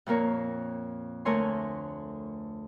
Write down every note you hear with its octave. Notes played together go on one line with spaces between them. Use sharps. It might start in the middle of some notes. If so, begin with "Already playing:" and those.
F2 A#2 A#3 A#4 C#5
D2 A3 A#4 C#5 G#5 C6